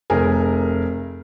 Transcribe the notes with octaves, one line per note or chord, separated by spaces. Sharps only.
F1 G#4 A#4